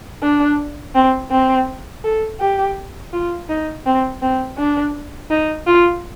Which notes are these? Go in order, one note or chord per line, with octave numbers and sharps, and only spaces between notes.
D4
C4
C4
A4
G4
F4
D#4
C4
C4
D4
D#4
F4